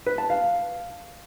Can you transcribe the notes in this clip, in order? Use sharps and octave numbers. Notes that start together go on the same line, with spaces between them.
B4
A5
F5